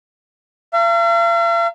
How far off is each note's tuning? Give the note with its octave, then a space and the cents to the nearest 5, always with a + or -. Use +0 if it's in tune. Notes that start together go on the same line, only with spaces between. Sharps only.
F5 -45 A#5 -35